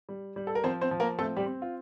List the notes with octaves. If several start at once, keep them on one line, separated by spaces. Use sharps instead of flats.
G3
G3
A4
A#4
F3 C4 C5
C4 C5
F3
A#3 A#4
A3 C4 A4
G3 G4
C4
F4